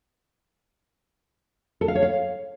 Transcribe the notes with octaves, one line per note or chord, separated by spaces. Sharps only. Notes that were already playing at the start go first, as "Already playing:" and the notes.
A4
F5
C#5
F5